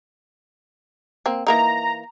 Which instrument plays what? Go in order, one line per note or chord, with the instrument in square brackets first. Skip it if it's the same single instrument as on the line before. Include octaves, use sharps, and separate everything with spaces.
[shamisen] A#3 C4
[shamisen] E3 A#3 D#4 [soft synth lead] A#5